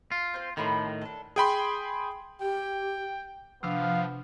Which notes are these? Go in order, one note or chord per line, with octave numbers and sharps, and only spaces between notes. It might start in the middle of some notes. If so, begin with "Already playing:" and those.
F4
C4 C5
A2 D#3 A4 B5 C6
D4 A4
G#4 G5 B5 C6
G4 G5
C3 F3 B3 D4 F5